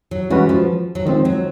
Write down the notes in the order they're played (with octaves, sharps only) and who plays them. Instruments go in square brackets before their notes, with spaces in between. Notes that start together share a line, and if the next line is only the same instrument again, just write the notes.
[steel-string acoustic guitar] F#3
[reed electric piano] E3 G#3 C#4 F#4 B4 [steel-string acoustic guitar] G3
[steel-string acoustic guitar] F3
F#3
[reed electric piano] D#3 G#3 C4 [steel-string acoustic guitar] F3
[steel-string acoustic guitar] F#3